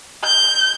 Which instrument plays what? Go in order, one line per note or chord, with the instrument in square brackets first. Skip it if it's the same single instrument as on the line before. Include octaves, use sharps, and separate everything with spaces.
[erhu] G6